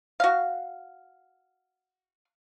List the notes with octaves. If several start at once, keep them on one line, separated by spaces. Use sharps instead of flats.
F#4 F5